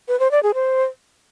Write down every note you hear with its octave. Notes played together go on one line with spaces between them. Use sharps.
B4
C5
D5
G#4
C5